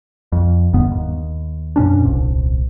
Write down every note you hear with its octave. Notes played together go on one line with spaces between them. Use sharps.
F2
E1 D2 G2 B3
D#2
F#2 B2 C#4 D4
D#1 C2